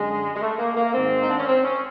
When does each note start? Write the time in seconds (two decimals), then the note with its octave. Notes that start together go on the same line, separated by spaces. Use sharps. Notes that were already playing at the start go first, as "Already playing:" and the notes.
Already playing: F#2 D3 G#3
0.34 G#3
0.41 A3
0.59 A#3
0.76 A#3
0.93 G#2 D#3 C4
1.20 D#4
1.29 D4
1.38 C#4
1.47 C4
1.64 C#4